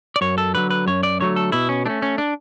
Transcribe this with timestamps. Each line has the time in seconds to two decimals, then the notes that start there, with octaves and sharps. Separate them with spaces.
0.16 D5
0.21 F#2 C#5
0.38 A4
0.54 D3 F#3 B4
0.71 B4
0.86 F#2 C#5
1.03 D5
1.20 D3 F#3 A3 C#5
1.36 A4
1.52 B2 E4
1.69 C#4
1.86 A3 C#4 D4
2.02 C#4
2.18 D4